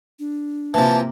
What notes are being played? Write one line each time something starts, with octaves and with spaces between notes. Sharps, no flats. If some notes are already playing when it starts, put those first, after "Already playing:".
D4
C3 E3 F3 A#3 A5